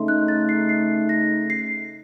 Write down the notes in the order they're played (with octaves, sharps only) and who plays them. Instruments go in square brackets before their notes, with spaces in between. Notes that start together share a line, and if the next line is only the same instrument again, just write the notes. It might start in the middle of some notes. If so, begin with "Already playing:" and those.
Already playing: [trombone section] C#3 A3 D#4 [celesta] C6
[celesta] F#6
A6
C7
C7
A#6
C7